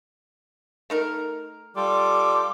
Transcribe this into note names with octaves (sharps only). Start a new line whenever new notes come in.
A3 D#4 A#4
G3 F4 A4 D6